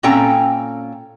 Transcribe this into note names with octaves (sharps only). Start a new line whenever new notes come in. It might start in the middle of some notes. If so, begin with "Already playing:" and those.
A#2 C4 C#4 A4 G5 A#5